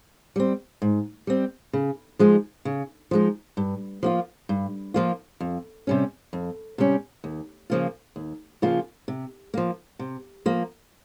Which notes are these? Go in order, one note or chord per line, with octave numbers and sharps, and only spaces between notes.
G3 C4
G#2
G3 C4
C#3
F3 G#3 D#4
C#3
F3 G#3 D#4
G2
F3 A#3 F4
G2
F3 A#3 F4
F2
C3 G3 C#4
F2
C3 G3 C#4
D#2
C#3 F3 A#3 F4
D#2
C#3 F3 A#3 F4
C3
F3 A#3
C3
F3 A#3